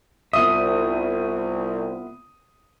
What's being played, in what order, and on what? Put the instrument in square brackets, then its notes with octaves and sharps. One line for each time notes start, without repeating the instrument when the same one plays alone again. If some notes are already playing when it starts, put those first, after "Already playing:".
[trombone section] C2 [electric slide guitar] B3 F4 E5 [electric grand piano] D#6